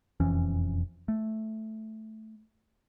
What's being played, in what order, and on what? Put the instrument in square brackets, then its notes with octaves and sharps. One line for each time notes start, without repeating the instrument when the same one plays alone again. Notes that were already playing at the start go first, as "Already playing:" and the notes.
[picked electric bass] E1 F2 E3 C#4
A3